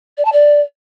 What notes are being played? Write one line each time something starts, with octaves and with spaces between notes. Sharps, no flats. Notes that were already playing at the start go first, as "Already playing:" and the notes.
D5
A5
D5